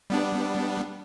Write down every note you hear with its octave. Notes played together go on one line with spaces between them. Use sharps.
G3 B3 D4